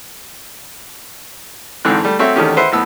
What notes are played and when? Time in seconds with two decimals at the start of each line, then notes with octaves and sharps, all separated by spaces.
1.85 G#1 G#2 D3 E3 C4 F#6
2.04 G3 A3
2.19 A3 C4 F#4 C#5 E5
2.36 E2 D#3 A3 C#4 G4
2.57 B4 C5 E5 F#5
2.72 B1 A2 B3 E6